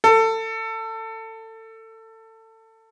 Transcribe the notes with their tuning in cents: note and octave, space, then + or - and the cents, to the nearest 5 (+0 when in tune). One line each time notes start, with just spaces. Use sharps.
A4 +25